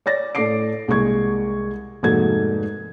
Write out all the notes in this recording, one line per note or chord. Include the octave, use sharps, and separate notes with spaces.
C#5 D5 A6 A#6
A2 A4 D5 D6 C7 D7
C2 G#3 A#3 C#6 G#6
F1 G#2 A#3 F#4 A4 G#6